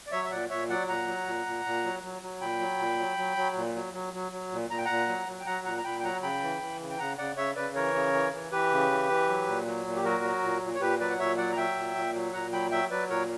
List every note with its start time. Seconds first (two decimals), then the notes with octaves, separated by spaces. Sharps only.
0.07 D5
0.11 F#3 C#5 E5
0.24 E5
0.31 A#2 D5 F#5
0.50 A#2 C#5 E5
0.69 F#3 D5 F#5
0.88 A#2 F#5 A#5
1.07 F#3
1.26 A#2
1.46 A#2
1.65 A#2
1.84 F#3
2.03 F#3
2.22 F#3
2.41 A#2 G5 B5
2.60 F#3
2.79 A#2
2.99 F#3
3.18 F#3
3.37 F#3
3.56 A#2
3.75 F#3
3.94 F#3
4.13 F#3
4.32 F#3
4.52 A#2
4.70 A#2 A#5
4.78 G5
4.85 A#2 F#5 A#5
5.08 F#3
5.27 F#3
5.40 G5
5.46 F#3 F#5 A#5
5.65 A#2 F#5 A#5
5.78 A#5
5.84 A#2 G5 B5
6.00 G5
6.03 F#3 F#5 A#5
6.22 C#3 G5 B5
6.43 E3
6.61 E3
6.80 C#3
6.90 G5
6.99 C#3 F#5 A#5
7.18 C#3 D5 F#5
7.37 C#3 C#5 E5
7.56 C#3 B4 D5
7.75 E3 A#4 C#5
7.95 C#3
8.13 E3
8.33 E3
8.52 E3 G4 B4
8.71 C#3
8.90 E3
9.10 E3
9.28 F#3
9.47 A#2
9.66 F#3
9.86 A#2
9.96 G4
10.04 F#3 F#4 A#4
10.24 F#3
10.43 A#2
10.62 A#2
10.75 C#5
10.81 A#2 G4 B4
11.00 F#3 B4 D5
11.10 F#5
11.19 A#2 C#5 E5
11.38 F#3 D5 F#5
11.52 A#5
11.57 F#3 E5 G5
11.76 A#2
11.95 A#2
12.15 F#3
12.33 A#2 F#5 A#5
12.52 F#3 G5 B5
12.72 F#3 E5 G5
12.91 F#3 B4 D5
13.09 A#2 A#4 C#5